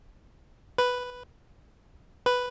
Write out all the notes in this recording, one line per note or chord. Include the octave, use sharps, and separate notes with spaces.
B4
B4